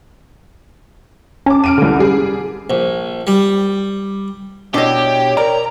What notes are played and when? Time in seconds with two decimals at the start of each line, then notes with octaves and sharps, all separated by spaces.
1.46 C#4 A5 D6
1.64 F6 D7 D#7
1.78 C2 D3
1.99 G3 G#4
2.70 A#1
3.27 G3
4.74 B2 D4 E4 G4 C#5 D#5
5.37 A#4 D5 A#5